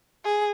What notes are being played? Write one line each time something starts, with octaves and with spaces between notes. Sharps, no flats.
G#4